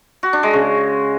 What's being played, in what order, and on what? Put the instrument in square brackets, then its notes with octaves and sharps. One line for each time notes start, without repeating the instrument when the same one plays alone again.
[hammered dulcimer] F#4
D4
G#3
C#3